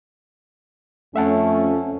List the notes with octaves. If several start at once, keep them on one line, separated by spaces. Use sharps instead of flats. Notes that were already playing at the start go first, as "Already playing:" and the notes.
F2 A3 C#4 E5 F#5 A5